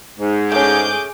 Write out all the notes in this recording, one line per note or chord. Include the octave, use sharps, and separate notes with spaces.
G#2
A3 C#4 G#4 D6 G6